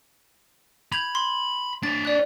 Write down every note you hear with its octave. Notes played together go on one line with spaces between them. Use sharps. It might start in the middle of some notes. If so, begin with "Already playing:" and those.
B5 G6 G#6 F7
C6
D4 C#5 A6
D5 F#6